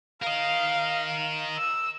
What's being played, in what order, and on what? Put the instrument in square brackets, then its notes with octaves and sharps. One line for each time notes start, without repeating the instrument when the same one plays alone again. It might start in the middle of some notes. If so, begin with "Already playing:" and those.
[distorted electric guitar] A#4 D#5 [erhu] F5
[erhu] E6